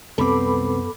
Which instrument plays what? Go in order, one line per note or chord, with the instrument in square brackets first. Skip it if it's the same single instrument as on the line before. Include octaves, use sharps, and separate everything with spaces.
[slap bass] C2 C4 [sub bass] F#2 [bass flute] B3 [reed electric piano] A4 B5 D6